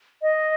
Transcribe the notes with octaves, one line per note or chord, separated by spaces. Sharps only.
D#5